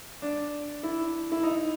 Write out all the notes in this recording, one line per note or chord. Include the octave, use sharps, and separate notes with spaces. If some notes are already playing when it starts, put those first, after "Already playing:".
D4
E4
E4
D#4